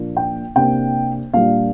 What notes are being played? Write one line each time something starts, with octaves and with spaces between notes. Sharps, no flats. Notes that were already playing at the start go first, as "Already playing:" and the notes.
Already playing: A#2 F3 A#3 D4
G5
C3 A#3 D4 G5
A#2 G3 D4 F5